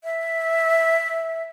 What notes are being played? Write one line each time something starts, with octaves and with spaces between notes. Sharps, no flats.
E5